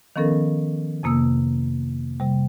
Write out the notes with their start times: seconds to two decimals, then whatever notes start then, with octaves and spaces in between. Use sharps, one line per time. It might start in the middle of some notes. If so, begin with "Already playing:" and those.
0.16 D#3 F3 B3 C#4 A4 A#4
1.03 F2 C3 A#3 D#6 E6
2.20 C3 G3